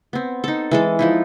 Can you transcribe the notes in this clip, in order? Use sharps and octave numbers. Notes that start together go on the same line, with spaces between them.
B3 C4
D#4 A4
E3 G#3 A4
F3 D#4 E4